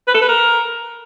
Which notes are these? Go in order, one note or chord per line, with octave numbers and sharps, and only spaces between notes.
B4
A4
B4
A#4